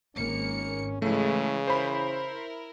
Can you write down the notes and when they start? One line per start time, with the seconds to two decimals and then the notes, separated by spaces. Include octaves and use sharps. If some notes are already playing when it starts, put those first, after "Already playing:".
0.16 G#1 A#3 C#4 C#7
1.02 C#3 E3 G#3 A3
1.68 E4 A#4 C5 B5